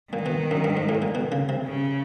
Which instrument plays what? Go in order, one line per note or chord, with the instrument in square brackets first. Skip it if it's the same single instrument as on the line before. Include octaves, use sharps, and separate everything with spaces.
[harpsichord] A#2 [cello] D#3
[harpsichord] B2
F#2
G2
G#2
A2
A#2
B2
C#3
C3
[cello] C#3